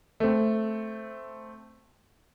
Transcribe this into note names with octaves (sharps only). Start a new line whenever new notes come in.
A3 C4